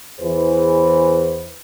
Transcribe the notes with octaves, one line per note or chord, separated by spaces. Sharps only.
E2 E3 G#4 B4 C5